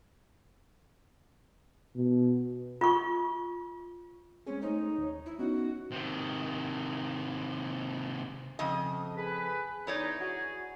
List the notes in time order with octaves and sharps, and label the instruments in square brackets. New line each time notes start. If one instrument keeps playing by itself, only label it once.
[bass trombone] B2
[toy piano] F4 C#6
[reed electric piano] G#3 C4 G#4 [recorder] C#4
[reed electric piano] A3 C5 C#5 [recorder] D#4
[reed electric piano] D#2 C#5
[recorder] E4
[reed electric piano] B3 C#4 D#4 [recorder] F#4
[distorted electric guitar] C3 D#3
[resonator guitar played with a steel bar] F2 C#3 D#5
[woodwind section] G#4 B4
[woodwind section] E2 D#4 [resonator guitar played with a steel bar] E4 C#5 D5
[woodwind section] F#4 G#4